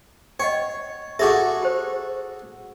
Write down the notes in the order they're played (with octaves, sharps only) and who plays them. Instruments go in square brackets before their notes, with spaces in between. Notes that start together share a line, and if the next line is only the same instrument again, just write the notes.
[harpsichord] C#5 [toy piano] D#5 F#5 G5
[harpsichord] F#4 G#4 A4 [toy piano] E5 D6
[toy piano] G4 C5